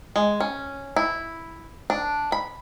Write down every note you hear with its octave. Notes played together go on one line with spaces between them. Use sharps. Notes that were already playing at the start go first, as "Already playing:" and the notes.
G#3
C#4
E4
D4
B5